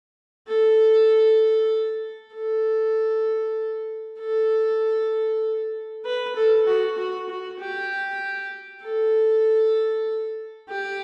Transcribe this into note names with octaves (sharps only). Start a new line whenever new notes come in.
A4
A4
A4
B4
A4
F#4
F#4
F#4
G4
A4
G4